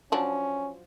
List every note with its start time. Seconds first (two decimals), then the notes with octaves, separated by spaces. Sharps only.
0.12 F3 F#3 C#4 D4